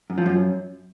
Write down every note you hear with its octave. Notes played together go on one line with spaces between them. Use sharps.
F#2
F3
F#2